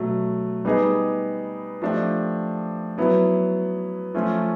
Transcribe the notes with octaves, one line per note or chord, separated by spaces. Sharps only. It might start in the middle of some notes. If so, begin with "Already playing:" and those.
Already playing: B2 F#3 A3
G3 B3 D#4 G#4
F3 A3 D4 G4
F#3 B3 E4
F3 A3 C#4 F4